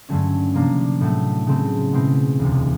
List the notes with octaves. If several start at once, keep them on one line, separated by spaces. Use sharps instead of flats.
G2 D3 F#3 A3 C#4
C3 F3 A#3 D4
A2 F#3 A3
C#3 F#3 A3 C4
B2 G#3 C4 E4
E1 D2 C3